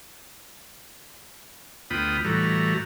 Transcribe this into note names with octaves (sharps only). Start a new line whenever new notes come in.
D2 B3 F4 G5 B5 D#6
A2 E3 G3 F#4 A4 A#5